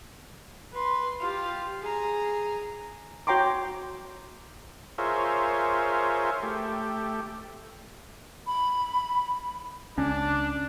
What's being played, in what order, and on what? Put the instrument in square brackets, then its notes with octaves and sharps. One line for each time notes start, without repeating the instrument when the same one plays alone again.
[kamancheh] B4 C6
F4 G4
G#4 A#5
[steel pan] F#4 C#5 G5 A#5 C6 D6
[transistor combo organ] F4 G#4 A#4 C5 C#5 E5
A3 G4
[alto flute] B5
[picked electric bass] C#2 C#4 [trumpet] D4